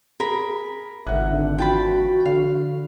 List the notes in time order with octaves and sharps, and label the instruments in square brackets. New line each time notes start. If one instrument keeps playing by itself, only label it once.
[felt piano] G#4 [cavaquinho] A#4 B5
[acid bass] G#1 [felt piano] C#2 F#5 F#6 [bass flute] E5
[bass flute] D3
[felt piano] E3 F3 F4 [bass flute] F#4 [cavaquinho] G5 A5 B5
[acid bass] D3 [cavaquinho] F5